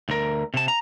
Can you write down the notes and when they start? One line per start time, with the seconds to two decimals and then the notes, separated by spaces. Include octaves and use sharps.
0.09 D2 A#4
0.54 C3 A5
0.68 A#5